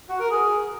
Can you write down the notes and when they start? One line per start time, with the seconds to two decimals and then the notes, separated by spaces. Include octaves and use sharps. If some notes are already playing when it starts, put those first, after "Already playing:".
0.09 F#4
0.20 A#4
0.31 G#4